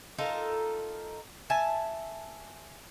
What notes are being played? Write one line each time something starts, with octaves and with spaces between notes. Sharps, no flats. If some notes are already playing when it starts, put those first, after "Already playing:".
D#4 F4 A4 A#4
E5 G#5 A5